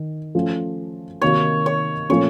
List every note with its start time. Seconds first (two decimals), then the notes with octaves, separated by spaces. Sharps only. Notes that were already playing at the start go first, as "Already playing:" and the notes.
Already playing: D#3
0.35 F3 A3 C#4
1.22 C3 D#3 A#3 D#4 F#4 C#5
1.66 C#5
2.09 A#2 F3 A3 C#4 C#5